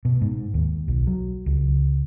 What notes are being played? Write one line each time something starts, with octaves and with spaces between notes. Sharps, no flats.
B2
G#2
D#2
B1
F#3
C#2